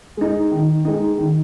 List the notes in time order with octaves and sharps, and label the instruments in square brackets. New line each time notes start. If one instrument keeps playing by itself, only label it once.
[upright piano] G#3 D#4
D#3
G#3 D#4
D#3